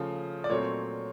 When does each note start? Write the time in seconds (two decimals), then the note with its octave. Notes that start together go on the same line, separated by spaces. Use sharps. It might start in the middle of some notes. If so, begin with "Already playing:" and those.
Already playing: C#3 F3 A3
0.44 D5
0.49 A#2 F#3 A3 C4 C#5